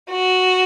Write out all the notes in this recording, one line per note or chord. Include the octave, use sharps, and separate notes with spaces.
F#4